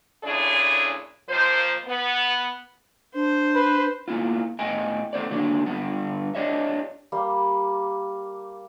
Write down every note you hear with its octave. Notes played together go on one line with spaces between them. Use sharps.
A#2 D3 C#4 D4 E4 G#4
D#2 F3 A#3 C5
B3
D4 C5
B4
A#3 B3 E4 F4
A2 B3 D#5 G5 G#5
A3 B3 C5 D5
D3 F#3 A#3 D4
G2 D3 E3 G3 B3
D4 G4 C#5 D#5 E5
G3 A#3